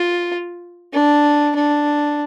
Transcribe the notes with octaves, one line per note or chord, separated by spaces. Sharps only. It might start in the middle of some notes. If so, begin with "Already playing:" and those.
Already playing: F4
D4
D4